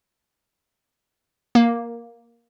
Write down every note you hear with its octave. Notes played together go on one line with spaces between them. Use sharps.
A#3